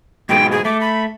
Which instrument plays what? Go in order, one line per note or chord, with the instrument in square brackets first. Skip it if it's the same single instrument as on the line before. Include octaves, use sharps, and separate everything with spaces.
[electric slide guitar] G#2 B2 G#3 [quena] G5
[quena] G#4
[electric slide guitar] A3 [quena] D6
[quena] B5